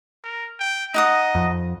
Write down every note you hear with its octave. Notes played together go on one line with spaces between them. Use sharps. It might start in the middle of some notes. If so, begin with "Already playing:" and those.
A#4
G5
D#4 D#5 F#5 D#6
F2